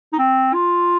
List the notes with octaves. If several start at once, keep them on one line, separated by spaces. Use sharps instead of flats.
D#4
C4
F4